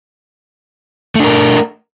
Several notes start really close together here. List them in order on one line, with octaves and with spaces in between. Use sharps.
A3 D4 A#4